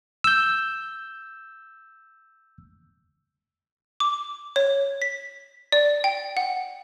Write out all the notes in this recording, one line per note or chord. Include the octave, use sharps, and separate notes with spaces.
E6 G6
D6
C#5
B6
D5
G5
F#5